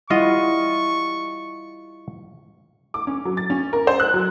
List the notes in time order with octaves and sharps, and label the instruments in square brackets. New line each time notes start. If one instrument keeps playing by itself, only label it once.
[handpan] G3 E4 F#5 [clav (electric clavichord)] F4 D#5 [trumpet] C#6
[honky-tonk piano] D6
C#4
F#3
A6
C#4
A#4
C5
F#6
F#3